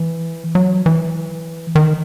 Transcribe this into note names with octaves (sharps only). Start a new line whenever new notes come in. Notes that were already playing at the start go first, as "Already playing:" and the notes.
Already playing: E3
F#3
E3
D#3